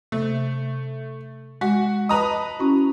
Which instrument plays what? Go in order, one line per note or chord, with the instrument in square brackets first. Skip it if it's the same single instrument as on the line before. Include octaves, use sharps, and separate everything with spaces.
[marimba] C3 [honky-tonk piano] A3
[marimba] G#3 [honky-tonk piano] F#4
[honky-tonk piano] B4 A#5 D#6 [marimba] D#5 A5
[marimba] C#4 E4 F#4